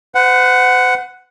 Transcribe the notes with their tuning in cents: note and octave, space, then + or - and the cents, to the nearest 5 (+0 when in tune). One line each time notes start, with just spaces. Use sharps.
C5 -45 F#5 +0